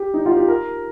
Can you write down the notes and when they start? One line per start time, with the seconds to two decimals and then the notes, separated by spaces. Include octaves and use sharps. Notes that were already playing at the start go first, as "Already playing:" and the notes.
Already playing: G4
0.14 D#4
0.26 F4
0.37 G4
0.48 A#4